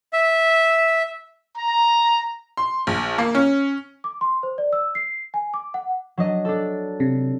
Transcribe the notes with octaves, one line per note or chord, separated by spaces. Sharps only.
E5
A#5
C6
A#1
A#3
C#4
D6
C6
C5
D5
E6
C7
G#5
D6
F#5
F#3 D4 D#5
D4 A4
C3